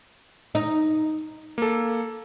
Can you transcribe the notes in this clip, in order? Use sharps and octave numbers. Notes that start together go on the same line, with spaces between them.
D#4
A#3 A4